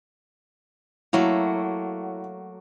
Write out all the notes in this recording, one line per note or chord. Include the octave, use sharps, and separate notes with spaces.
F#3 A3 A#3 E4